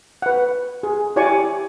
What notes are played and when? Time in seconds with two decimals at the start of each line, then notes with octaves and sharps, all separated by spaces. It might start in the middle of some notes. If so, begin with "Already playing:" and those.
0.22 B4 F#5
0.83 G#4
1.16 E4 G4 C#5 D5 G#5 C#6